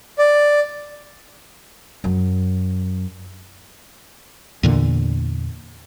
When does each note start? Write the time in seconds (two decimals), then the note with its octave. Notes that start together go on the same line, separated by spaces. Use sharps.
0.19 D5
2.04 F#2
4.63 E2 A#2 D3